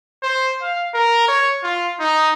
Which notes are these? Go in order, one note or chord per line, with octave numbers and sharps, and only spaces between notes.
C5
F5
A#4
C#5
F4
D#4